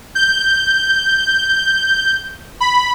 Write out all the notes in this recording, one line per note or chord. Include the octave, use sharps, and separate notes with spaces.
G6
B5